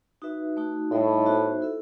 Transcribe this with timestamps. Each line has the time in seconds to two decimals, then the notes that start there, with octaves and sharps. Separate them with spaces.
0.22 D#4 F#4 B4 E5
0.57 A3 D#4 F#4
0.91 A2 G3 D#4 A4 D#5
1.26 B3 D#4 F#4 C5 E5
1.61 E4 A4 E5